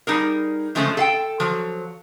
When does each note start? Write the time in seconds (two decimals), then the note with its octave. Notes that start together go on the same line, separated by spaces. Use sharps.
0.07 G3 D#4 G#4 A#4
0.75 C#3 F3 G#3 A3 C4 C#4
0.97 A4 F5 G5
1.40 F3 F#3